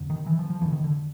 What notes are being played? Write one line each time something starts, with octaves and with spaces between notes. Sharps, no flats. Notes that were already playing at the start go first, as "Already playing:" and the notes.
Already playing: F2 D3
D#3
E3
F3
F3
F2 D3 E3
D#3
D3